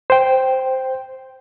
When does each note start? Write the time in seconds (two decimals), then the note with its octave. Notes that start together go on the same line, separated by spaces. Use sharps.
0.10 C5 G5